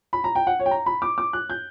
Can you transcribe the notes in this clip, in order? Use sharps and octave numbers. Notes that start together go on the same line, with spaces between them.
B5
A#5
G5
F#5
C#5
G5
A#5
B5
D6
D6
F#6
G6